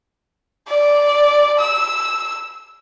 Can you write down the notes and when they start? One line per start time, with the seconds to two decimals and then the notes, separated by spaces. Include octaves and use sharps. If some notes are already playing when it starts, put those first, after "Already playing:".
0.69 D5
1.59 E6